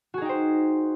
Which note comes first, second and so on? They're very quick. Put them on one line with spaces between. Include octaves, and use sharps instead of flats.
F#4 G#4 D#4 G5 C5